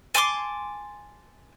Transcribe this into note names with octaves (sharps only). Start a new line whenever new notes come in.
G#5 A5 C6 D6